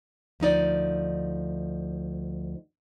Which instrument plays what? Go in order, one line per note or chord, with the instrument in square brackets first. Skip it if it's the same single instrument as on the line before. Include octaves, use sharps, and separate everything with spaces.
[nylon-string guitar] D2 F3 D#4 D5